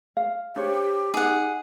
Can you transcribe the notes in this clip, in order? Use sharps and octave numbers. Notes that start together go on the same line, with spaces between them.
F5
D4 G4 C5 C#5
D#4 G#4 F#5